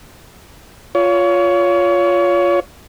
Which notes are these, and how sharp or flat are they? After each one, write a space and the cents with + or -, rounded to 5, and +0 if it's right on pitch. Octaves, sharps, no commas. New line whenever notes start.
F4 +5 C#5 +25